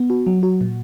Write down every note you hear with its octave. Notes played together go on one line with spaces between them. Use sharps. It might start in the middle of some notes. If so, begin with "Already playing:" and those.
Already playing: B3
F#4
F#3
F#4
A#2